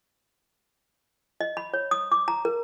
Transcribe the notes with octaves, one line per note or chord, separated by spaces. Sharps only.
D#5
B5
C#5
D#6
D6
A#5
A#4